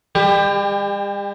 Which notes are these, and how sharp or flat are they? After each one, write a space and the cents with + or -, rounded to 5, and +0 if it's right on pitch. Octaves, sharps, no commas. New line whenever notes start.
G3 +45 G4 +20